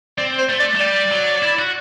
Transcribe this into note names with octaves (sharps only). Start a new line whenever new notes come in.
C4 D5
C5
A3
D5
A3
G3 D5
F#3
E4
F#4